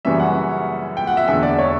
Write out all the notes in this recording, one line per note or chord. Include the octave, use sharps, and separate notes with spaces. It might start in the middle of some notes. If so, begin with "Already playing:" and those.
F#2 C#3 E3 G3 C#4 E5
F#5
G5
F#5
E5
E1 E2 D3 E5
D5
C#5